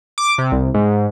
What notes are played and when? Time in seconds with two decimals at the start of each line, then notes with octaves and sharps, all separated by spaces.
0.18 D6
0.38 C3
0.52 C2
0.74 G#2